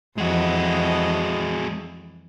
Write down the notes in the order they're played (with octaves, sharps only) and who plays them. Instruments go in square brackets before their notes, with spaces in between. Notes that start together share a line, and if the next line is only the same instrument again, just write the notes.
[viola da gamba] F2 E3 D#5 [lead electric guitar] G#3 F#4